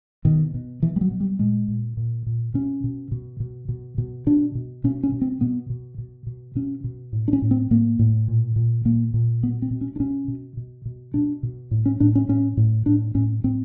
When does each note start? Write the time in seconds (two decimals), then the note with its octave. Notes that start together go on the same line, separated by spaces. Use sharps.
0.25 B2 D#3
0.54 B2
0.82 B2 E3
0.96 G3
1.01 F#3
1.11 B2
1.20 G3
1.39 A#2 G#3
1.68 A#2
1.97 A#2
2.26 A#2
2.54 B2 C#4
2.84 B2
3.12 B2
3.40 B2
3.69 B2
3.98 B2
4.26 B2 D4
4.55 B2
4.84 B2 C#4
5.03 C#4
5.12 B2
5.21 C4
5.41 B2 B3
5.70 B2
5.98 B2
6.27 B2
6.55 B2 C#4
6.84 B2
7.13 A2
7.28 D4
7.33 C#4
7.42 A2
7.51 C4
7.71 A2 A#3
7.99 A2
8.28 A#2
8.56 A#2
8.85 A#2 A#3
9.14 A#2
9.43 B2 B3
9.62 C4
9.71 B2
9.81 C#4
9.96 D4
10.00 B2 C#4
10.28 B2
10.57 B2
10.85 B2
11.14 B2 D4
11.43 B2
11.71 A2
11.86 C#4
12.00 A2 D4
12.15 C#4
12.29 A2 C#4
12.57 A2
12.86 A2 D4
13.15 A2 C#4
13.44 A2 C4